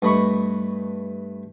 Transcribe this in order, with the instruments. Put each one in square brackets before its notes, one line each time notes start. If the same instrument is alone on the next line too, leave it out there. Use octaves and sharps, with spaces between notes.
[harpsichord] G2 A3 D#5 B5 C#6